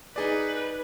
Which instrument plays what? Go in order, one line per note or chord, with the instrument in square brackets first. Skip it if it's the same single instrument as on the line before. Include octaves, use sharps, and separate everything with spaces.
[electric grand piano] D#4 G#4 D5 [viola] B4